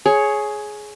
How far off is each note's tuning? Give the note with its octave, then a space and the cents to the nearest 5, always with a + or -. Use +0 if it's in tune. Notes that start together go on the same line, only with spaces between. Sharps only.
G#4 +15 C#5 +0